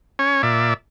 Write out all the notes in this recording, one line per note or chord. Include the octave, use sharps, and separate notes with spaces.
C#4 C#5
A#2 D5 E5